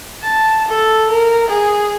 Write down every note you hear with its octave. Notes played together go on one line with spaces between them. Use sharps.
A5
A4
A#4
G#4